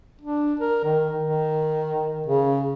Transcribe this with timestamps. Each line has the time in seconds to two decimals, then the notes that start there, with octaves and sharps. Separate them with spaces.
0.22 D4
0.60 A#4
0.84 D#3
1.23 D#3
2.26 C#3